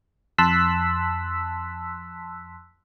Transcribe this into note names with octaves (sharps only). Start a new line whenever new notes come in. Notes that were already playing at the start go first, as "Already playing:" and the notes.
F2 A5 C6 E6 F#6 B6